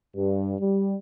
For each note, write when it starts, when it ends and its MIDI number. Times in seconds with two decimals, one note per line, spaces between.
0.15 0.54 43
0.59 0.95 55